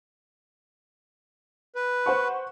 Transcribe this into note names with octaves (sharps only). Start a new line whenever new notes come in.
B4
C5 F#5 C#6